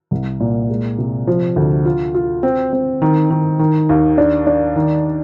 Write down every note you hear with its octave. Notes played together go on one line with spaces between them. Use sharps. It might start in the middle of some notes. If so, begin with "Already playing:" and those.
C2
A#2
G#3
C3
F3
D2
F4
F4
C4
C4
D#3
D#3
D#3
D#2
D4
D4
D#3